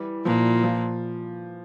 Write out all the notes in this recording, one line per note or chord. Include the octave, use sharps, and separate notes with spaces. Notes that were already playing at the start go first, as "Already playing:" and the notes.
Already playing: E3 G3
A#2 F3
F3